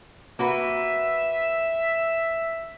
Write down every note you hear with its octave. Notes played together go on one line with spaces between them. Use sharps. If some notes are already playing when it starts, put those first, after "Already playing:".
A#3 F#4 B4 E5